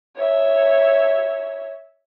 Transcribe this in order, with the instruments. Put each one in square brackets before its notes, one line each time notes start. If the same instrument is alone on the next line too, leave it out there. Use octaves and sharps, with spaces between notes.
[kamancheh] C#5 E5